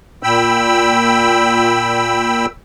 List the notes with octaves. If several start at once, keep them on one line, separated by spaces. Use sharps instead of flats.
A#2 G5 B5 E6